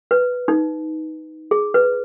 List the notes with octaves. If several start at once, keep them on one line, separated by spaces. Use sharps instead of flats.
B4
D#4
G#4
B4